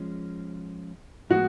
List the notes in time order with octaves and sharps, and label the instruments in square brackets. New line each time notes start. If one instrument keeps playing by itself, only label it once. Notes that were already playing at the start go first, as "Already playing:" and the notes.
Already playing: [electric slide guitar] F3 G#3 C#4
[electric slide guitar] A2 F3 G#3 B3 [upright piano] F#4